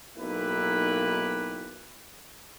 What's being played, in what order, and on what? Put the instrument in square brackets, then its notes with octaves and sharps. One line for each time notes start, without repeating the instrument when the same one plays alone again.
[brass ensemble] B1 G#2 A#3 E4 G4 B4